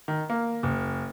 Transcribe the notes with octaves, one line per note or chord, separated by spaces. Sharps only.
D#3
A#3
F#1